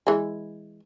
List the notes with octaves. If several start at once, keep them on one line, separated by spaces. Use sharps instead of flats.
E3 G#3